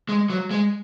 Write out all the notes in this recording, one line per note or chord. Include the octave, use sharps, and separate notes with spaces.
G#3
F#3
G#3